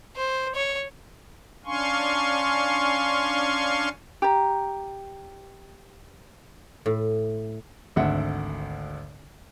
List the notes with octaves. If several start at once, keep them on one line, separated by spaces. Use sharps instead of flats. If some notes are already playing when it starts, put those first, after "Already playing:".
C5
C#5
C#4 D4 F5 G#5 C6 C#6
G4 A#5
A2
G#1 D2 E5 F#5